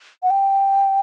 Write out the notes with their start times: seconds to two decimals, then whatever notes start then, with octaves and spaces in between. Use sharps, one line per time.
0.23 F#5
0.30 G5